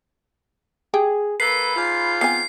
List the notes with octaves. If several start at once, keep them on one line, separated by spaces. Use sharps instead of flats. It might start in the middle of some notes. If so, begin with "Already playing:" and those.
G4 G#4 G5
A#3 A4 B4 B5 C7
G#2 F4
B3 C4 G#5 C7